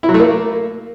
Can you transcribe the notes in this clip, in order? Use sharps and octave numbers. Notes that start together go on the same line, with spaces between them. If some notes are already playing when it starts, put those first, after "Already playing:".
E4
F#3
A3
A#3